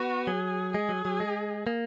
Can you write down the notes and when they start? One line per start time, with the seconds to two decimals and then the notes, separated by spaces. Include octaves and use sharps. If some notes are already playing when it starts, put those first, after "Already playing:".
Already playing: B3 F#4
0.27 F#3 G#4
0.73 G#3 G#4
0.89 F#3
1.05 F#3
1.20 G#3
1.67 A#3